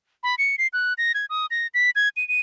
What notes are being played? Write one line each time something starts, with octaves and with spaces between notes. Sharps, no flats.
B5
C#7
C7
F#6
A#6
G#6
D#6
A#6
B6
G#6
D#7
D#7